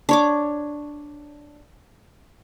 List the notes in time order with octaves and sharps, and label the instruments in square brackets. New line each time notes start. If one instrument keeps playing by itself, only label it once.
[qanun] D4 C#5 D6